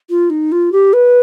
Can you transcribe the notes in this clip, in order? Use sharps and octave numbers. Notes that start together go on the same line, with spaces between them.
F4
D#4
F4
G4
B4